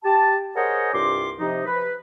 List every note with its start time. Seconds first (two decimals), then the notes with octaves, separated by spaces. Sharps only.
0.04 G4 A5
0.56 G#4 A#4 C5 C#5 D#5 F#5
0.94 C2 G2 F4 C6 D6
1.40 C3 F3 D#4
1.66 B4